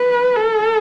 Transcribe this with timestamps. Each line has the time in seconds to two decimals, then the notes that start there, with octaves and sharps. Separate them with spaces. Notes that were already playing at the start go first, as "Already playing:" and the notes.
Already playing: B4
0.37 A4